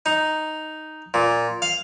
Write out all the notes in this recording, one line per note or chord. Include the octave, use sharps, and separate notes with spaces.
D#4
A#2
F5